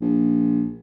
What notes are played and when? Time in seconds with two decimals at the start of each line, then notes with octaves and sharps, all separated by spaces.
0.01 A#1